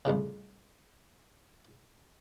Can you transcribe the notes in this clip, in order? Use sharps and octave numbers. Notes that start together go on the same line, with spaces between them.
C2 F2 A2 C#3